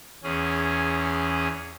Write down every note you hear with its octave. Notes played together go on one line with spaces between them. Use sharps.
E2 C#4 G#4